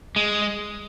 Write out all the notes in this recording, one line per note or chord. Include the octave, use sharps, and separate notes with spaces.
G#3